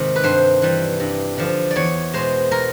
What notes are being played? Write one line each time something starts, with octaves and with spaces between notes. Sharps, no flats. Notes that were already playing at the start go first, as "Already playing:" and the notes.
Already playing: G#2 C3 D#3 G#3
B4
G2 C5
E3 G3
G2
D3 F3
D5
E2 C#5
B2 G#3 C5
B2 A#4